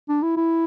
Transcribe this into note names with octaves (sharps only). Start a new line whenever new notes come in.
D4
E4
E4